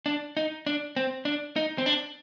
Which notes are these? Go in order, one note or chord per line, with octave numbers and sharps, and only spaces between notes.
D4
D#4
D4
C4
D4
D#4
C4
D4